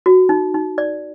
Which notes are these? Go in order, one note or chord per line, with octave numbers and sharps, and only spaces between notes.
F#4
D#4
D#4
D5